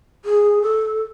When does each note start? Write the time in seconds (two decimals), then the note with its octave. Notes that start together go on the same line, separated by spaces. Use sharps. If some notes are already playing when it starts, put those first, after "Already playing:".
0.25 G#4
0.62 A4